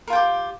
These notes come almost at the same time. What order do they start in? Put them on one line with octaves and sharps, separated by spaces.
A#4 F4 G5 G4